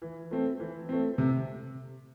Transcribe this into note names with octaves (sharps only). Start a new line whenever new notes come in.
E3
A3 C4
E3
A3 C4
C3